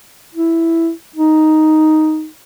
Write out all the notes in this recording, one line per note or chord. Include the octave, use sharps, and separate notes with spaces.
E4
D#4